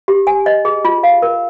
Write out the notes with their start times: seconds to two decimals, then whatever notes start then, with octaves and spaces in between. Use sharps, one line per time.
0.08 G4
0.27 G#5
0.46 D#5
0.65 G#4
0.85 F4
1.03 F5
1.22 A#4